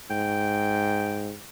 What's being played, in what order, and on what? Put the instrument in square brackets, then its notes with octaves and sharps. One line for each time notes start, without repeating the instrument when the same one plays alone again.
[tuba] G#2 [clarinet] G5